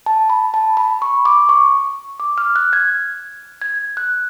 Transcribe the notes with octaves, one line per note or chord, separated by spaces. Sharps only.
A5
B5
A5
B5
C#6
D6
C#6
D6
F6
F#6
G#6
G#6
F#6